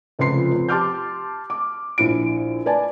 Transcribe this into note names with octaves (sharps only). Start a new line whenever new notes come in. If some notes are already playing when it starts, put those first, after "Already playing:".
F1 C#2 F3 B4 C6 C7
F2
G4 A5 C6 D6 F6 G6
D6
A#1 E4 D7
B4 D5 G#5 A5